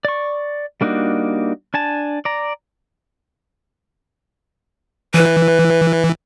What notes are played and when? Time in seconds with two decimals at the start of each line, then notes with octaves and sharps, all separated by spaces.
0.05 D5 C#6
0.81 G3 A#3 D4 D#4 F#4
1.74 D4 G#5 A5
2.25 D5 A#5
5.14 E3 B4